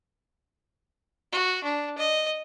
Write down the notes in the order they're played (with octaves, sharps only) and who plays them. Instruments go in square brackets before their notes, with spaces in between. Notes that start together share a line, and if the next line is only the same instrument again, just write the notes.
[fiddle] F#4
D4
D#5